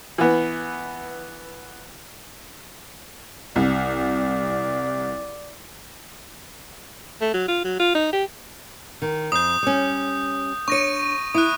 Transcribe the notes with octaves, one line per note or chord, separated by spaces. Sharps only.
E3 B3
C2 D5
A3
F#3
F4
F#3
F4
D#4
G4
D#3
F2 D#6 G6
G3 C#4
D4 C#5 C#6 A#6 D#7
E4 D#6 F#6